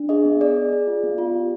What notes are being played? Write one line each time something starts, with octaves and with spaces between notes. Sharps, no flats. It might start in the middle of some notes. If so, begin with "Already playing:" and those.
Already playing: D4
G#4 D#5
B3
G#4 D5
G#4
G#4
F4
B3
F4
G4